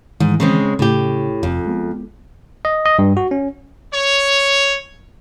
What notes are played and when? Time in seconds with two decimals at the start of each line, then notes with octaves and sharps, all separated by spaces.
0.20 G#2 D#3 E3
0.40 C#3 G#3 C4
0.79 A2 C#3 G4
1.43 F1 F2
1.66 G#3 B3
2.65 D#5
2.86 D#5
2.99 G2
3.17 F#4
3.31 C#4
3.92 C#5